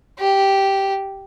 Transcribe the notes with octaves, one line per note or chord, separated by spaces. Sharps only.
G4